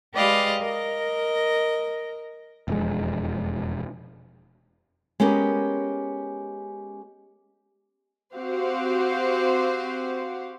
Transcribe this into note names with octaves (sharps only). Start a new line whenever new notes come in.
G#3 G4 B4 D5 D#5 F5
A#4 D#5
E1 F2 G#3
G#3 B3 C#4 G4 A#4
C4 F#4 G4 C5 F5 F#5